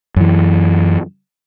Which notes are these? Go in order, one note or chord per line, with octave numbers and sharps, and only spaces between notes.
F#2 E3